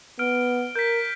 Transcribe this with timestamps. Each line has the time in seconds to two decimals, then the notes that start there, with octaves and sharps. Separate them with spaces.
0.19 B3 F6 D7
0.76 A#4 G6 B6